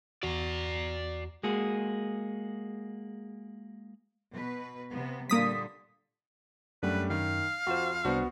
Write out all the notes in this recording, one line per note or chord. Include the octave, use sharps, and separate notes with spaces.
E2 F#4 D5 A#5
G#3 A#3 F#4 G#4
B2 B4
C3 B3
A#2 D3 G3 A#3 D#6 B6
F#2 G3 A3 D4 B4
D#3 F5
F2 F4 F#4 C5 E7
C2 B3 D4 F#4 C5